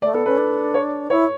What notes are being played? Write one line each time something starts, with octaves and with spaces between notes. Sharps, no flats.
A3 D5
B3 A4
C#4 B4
D4
C#5
E4 C#5